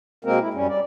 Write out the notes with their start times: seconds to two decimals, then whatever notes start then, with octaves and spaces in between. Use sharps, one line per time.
0.25 B2 G#3 A#3 C4 A#4
0.40 E4
0.54 F#2 G3 C#4
0.68 G3 D5